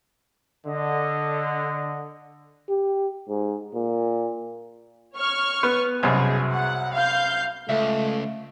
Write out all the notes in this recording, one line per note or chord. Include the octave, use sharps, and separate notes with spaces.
D3 D#5
G4
G#2
A#2
C#5 C#6 F6
B3
C2 F#2 B2 G#4
F#5
F5 G6
C#2 A3 E5 F5